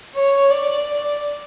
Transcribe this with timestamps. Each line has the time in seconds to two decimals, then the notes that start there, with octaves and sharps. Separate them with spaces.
0.16 C#5
0.50 D5